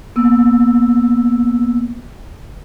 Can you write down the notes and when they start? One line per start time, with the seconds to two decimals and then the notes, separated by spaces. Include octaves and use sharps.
0.16 A#3 B3 E6